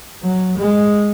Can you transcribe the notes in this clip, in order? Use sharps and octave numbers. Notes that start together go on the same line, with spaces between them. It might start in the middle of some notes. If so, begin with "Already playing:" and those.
F#3
G#3